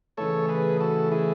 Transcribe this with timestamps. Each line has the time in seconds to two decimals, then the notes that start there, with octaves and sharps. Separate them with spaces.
0.17 C#3 E3 A3 A4 C#5
0.48 G#4 B4
0.81 F#4 A4
1.12 E4 G#4